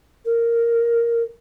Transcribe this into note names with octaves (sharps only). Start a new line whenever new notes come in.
A#4